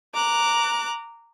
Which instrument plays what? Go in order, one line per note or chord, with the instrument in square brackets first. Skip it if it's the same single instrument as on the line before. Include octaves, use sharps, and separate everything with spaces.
[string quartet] A#5 D6 F#6